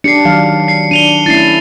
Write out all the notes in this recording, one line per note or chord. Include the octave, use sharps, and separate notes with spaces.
D4 G4 D5 C7 C#7
D#3 F#3 F5
C7
D4 D#7 F7 G7
A3 C#4 E4 A6 C7